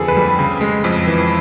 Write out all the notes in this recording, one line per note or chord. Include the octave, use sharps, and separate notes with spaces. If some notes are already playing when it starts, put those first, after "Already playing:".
Already playing: F2 D3 B3 G#4 A4
B4
G3
C#3
G#3
F2
E3